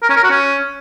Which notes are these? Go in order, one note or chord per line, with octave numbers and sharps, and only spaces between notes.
A#4
C#4
A#4
F#4
C#4